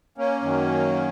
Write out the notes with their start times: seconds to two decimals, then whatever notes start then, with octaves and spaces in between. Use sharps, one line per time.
0.18 A#3 C#4
0.42 F#2 D#3 F#3